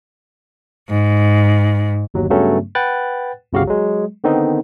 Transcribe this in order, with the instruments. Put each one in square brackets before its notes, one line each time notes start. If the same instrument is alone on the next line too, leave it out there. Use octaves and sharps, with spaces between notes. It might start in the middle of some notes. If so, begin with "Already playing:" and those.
[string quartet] G#2
[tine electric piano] G1 D#2 F#3
G2 C#3 F#3 A3 B3 C#4
B4 F#5 G5 F#6 A6
G1 C2 C#3 F#4 G4 F5
F#3 G#3
D3 D#3 B3 C4 D#4